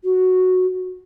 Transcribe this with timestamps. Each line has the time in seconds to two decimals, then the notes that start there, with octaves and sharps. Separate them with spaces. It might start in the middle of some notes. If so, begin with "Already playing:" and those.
0.04 F#4